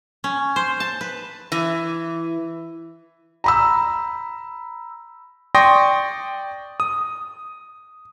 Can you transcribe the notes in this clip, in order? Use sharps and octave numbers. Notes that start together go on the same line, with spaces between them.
C#4
C5
A5
B4
E3
A#5 B5 E6
D5 G5 C6 C#6 D#6 A#6
D#6